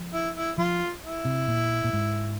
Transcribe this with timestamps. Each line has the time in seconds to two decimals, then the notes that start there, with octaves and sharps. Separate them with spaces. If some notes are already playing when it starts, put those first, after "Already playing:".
Already playing: F3
0.13 E4
0.36 E4
0.58 F3 F4
1.03 E4
1.25 C3
1.48 A#2
1.84 A#2
1.93 G#2